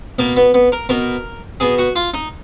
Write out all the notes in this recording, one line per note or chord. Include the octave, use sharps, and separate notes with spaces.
B2 A#3
B3
B3
A#4
B2 A#4
B2 G#4
F#4
F4
D#4